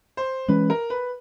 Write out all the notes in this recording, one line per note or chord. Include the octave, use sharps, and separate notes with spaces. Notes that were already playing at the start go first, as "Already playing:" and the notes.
C5
E3 G#3 C#4 B4
A#4
B4